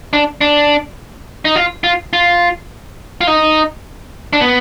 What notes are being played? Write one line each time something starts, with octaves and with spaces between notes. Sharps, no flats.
D4
D4
D#4
F4
F4
F4
F4
D#4
D4
B3